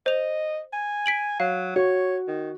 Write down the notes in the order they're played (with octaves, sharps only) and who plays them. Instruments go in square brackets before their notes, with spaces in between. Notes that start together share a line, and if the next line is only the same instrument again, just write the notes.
[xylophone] C5 F7 [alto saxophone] D#5
[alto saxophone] G#5
[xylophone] B6 D7 F#7
[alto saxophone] F#3 [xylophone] F5
[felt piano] F#4 [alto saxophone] C#5
[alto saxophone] D#3